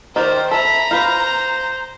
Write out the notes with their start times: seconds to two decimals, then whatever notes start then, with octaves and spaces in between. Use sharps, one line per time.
0.16 D#3 G4 A#4 C5 D5
0.51 A4 E5 A#5 B5
0.91 F4 B4 C5